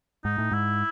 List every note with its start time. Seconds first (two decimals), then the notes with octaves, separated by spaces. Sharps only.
0.24 G#2 D#4
0.38 A2
0.52 G#2 E4